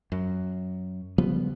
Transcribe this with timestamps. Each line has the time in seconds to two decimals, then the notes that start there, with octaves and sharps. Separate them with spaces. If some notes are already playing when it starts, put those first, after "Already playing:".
0.12 F#2
1.18 C#3 F3 G3 B3